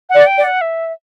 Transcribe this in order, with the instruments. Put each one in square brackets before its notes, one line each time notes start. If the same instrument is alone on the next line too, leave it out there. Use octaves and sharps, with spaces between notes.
[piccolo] F#5
[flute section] D5
[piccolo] G5
[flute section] D5
[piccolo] F#5
E5